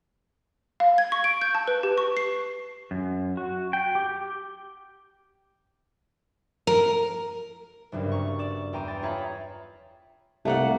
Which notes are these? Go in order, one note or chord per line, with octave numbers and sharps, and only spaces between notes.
F5
G#6
C#6
D7
G6
A5
B4
G4
C#6
C7
F#2
F#4
G5
G4
A#4
F#1 C2 G2
A#5 C#6
D5 D6 E7
E2 G5 A#5 C6 D#7
G5 A6
F4 G#4 C#5 E5 A#5 B5
C2 A3 A#3 F#5